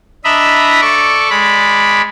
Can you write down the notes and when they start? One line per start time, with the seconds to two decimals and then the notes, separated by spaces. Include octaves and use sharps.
0.24 D4 D#5 E5 A#5 B5
0.81 A4 D5 C#6
1.30 G#3 D5 B5